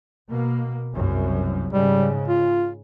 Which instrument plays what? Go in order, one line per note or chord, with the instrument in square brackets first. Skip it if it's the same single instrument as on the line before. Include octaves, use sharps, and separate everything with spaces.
[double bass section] B2 A#3
F#1 C2 F#2
[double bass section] G#2 C#3 [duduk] G3
[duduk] F4